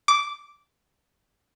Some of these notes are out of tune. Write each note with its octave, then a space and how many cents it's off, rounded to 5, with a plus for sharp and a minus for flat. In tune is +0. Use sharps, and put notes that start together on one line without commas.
D6 -10